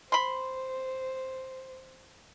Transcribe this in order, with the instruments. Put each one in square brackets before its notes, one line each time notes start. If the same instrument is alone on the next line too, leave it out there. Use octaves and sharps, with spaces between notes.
[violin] C5 [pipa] B5 C6